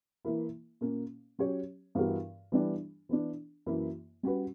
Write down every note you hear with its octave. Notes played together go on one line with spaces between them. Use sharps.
E3 A#3 E4
A#2 A#3 C#4
F#3 C#4 G4 C#5
G2 E3 B3 F#4 A#4
E3 G3 B3 D4
E3 B3 D4
F#2 E3 A#3 E4
G3 C#4 F#4 B4